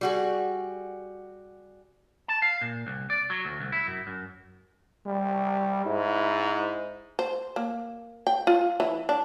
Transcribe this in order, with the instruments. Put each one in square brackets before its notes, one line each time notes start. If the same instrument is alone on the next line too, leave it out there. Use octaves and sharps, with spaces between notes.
[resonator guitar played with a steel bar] G3 F#4 G#4
[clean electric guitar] A5
F5
A#2
C2
D5
F#3
D2
C2
E4
F#2
F#2
[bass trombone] G3
[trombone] G#2 [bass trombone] E4
[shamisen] C5
A#3
G5
F4
E3
D4